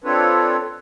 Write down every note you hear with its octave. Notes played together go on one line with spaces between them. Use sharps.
C4 D4 F4 A4 B4 C#5